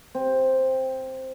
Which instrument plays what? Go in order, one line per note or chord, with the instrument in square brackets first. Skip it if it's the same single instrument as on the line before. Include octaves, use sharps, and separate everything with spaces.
[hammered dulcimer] C4